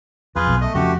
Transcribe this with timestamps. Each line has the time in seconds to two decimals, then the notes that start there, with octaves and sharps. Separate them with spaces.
0.36 F2 F4 G#4 B4
0.47 B1
0.61 A3 D#5
0.75 F2 C#3 F3 A3 F#4 G4